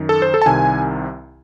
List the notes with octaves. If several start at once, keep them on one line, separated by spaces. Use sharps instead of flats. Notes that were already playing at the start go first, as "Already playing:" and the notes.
Already playing: F#2 D#3
A4
C5
A4
A5
C2 C3 D#3 G#5